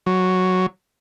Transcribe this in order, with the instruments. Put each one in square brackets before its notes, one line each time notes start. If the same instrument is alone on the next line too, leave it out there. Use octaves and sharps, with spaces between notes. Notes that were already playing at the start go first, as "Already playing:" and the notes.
[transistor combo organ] F#3